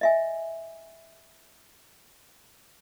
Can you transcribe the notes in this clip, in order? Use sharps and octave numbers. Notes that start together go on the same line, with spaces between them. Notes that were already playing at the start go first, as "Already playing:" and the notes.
D#5 E5 G#5